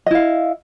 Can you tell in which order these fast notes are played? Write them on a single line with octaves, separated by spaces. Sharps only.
D#5 E4 F5